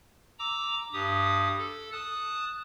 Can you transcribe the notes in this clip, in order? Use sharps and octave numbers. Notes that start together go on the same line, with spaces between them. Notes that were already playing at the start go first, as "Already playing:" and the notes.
A#5 D6 E6
G2 G4 D#6
A4
A5 D#6 F#6